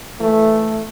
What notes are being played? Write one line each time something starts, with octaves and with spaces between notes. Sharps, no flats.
E3 A3